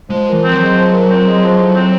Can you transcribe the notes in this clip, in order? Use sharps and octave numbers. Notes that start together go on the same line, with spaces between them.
F3 G#3
A#2
E3
C4
F3
F#3
G#3
F3
A#2
C4
G#3
F3
A2
C4